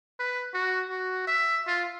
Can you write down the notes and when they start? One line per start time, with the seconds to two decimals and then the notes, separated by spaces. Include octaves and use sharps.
0.19 B4
0.54 F#4
0.90 F#4
1.27 E5
1.67 F4